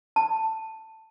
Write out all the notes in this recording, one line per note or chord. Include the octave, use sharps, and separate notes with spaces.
A5